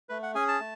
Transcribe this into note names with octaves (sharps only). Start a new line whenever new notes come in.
A3 B4
F#5
C#4 G#4 G#5
A5
A3